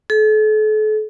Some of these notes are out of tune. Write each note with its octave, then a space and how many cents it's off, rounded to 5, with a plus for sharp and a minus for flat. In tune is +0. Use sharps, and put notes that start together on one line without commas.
A4 -40